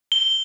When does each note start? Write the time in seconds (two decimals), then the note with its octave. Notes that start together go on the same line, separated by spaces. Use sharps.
0.12 G7